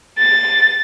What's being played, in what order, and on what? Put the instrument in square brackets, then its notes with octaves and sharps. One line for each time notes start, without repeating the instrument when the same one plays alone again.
[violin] A6